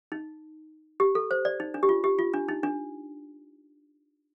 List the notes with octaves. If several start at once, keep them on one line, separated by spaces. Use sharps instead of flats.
D#4
G4
A4
C5
D5
D#4
D4
G4
F4
G4
F4
D4
D#4
D4